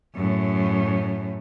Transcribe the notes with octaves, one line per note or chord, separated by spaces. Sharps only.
F#2 A2